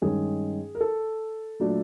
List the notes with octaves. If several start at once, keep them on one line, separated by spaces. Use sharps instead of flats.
G2 D#3 G#3 C#4 G#4
A#4
A4
A#2 F#3 A3 D4